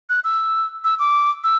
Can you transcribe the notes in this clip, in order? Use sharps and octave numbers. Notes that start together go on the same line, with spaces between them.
F#6
E6
E6
D6
E6